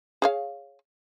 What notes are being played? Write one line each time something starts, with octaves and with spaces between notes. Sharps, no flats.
G#4 C#5 F5